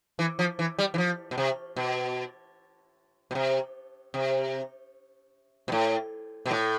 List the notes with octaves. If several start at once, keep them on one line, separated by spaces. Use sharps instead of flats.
E3
F3
E3
G3
E3
F3
B2
C3
B2
B2
C3
C3
B2
A2
B2
A2